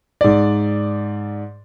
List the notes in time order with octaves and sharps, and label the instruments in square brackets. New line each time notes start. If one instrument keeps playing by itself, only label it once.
[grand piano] G#2 D5